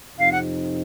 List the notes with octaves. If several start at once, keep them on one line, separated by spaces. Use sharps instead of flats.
F2 C3 F3 C4 D#4 F5
F#5